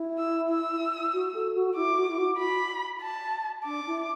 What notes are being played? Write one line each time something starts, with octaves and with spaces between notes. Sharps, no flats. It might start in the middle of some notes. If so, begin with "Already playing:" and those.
Already playing: E4
E6
E6
F#4
A4
F#4
E4 D6
F#4
E4
F#4
B5
A5
D4 D6
E4